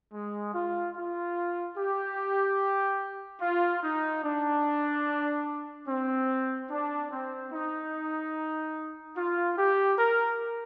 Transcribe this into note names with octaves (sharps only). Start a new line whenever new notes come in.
G#3
F4
F4
G4
F4
D#4
D4
C4
D4
C4
D#4
F4
G4
A#4